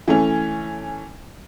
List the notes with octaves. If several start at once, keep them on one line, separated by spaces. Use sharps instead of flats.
E3 A3 C#4